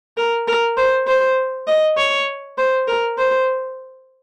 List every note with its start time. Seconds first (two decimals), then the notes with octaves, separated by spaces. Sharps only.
0.17 A#4
0.48 A#4
0.77 C5
1.07 C5
1.67 D#5
1.97 C#5
2.58 C5
2.87 A#4
3.18 C5